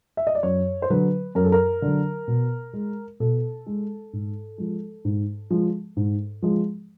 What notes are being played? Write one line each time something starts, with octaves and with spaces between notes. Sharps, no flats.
E5
D#5
D5
F#2 C#5
C5
D3 F#3 B4
F#2 A#4
A4
A#4
D3 F#3
B2
G#3
B2 A4
G#3
G#2
F3 G#3
G#2
F3 G#3
G#2
F3 G#3